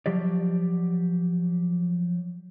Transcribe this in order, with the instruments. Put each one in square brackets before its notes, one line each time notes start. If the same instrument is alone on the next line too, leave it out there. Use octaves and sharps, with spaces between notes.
[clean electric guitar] F3 F#3 G4 D5